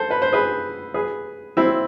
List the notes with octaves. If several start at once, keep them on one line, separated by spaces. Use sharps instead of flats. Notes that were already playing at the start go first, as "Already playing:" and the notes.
Already playing: A4 C5
B4
C5
G#4 B4
G#4 B4
C4 E4